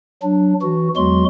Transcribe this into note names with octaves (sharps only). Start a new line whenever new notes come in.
F#3 D4
E3 F#4
E2 F#3 G#3 F#4 C6